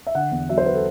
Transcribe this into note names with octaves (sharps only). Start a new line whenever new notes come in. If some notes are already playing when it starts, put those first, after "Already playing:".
E5
D3 F#5
E2
F#3 E5
C5
B4
A4